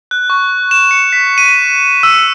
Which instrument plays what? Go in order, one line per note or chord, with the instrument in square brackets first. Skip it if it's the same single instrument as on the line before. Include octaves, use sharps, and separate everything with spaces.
[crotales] F#6
C#6
E7
C#7
B6
D#7
E6